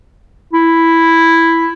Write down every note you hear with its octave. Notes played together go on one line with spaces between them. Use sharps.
E4